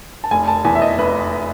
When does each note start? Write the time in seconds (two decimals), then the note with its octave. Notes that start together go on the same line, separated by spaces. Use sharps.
0.24 A5
0.31 F1 G#5
0.48 A5
0.65 E2 G#5
0.75 E5
0.82 D#5
0.99 F1 B4